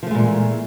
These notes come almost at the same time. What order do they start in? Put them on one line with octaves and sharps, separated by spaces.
F3 A3 G#3 A#2 E3